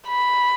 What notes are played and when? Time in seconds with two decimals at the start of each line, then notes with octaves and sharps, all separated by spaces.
0.08 B5